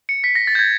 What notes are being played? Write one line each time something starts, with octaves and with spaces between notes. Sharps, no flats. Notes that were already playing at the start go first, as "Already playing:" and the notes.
C#7
B6
A#6
A6
G6
G#6